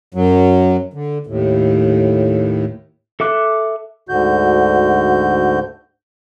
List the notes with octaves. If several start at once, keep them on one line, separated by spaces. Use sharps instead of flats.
F#2 F#3
D3
D#2 A2
A4 E5 D6 F#6
D2 G#2 D3 F#4 G6